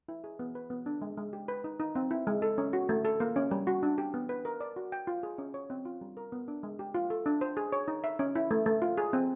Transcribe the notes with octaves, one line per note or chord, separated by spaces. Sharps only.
E4
G#4
B3
B4
B3
D4
G#3
G#3
G4
B4
D#4
D#4
C4
E4
G#3
A4
C#4
F#4
A3
A4
A#3
C#4
G3
F#4
D4
G4
B3
B4
A#4
D5
F#4
G5
F4
G#4
C#4
C#5
C4
F4
G3
A#4
B3
D4
G#3
G4
F4
A4
D4
C5
G#4
C#5
D#4
E5
C#4
E4
A3
A3
F4
G#4
C4